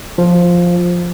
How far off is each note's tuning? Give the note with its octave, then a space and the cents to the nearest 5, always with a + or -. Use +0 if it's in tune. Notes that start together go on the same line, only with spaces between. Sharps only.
F3 +5